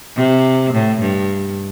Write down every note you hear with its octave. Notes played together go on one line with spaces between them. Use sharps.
C3
A2
G2